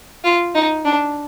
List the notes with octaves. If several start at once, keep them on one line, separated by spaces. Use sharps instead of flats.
F4
D#4
D4